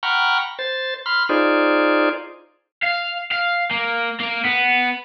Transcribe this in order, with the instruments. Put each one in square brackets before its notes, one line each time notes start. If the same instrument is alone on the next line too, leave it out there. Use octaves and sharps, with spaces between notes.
[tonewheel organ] F#5 G5 A#5 B5 C#6 F6
C5 A6
B5 C6 F6
D#4 F4 G#4 C5 D5
[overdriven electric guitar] F5
F5
A#3
A#3
B3